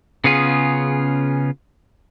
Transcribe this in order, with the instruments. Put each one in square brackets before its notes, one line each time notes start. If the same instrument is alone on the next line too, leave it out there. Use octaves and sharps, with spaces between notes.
[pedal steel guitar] C#3 B3 C#4 F4 G#4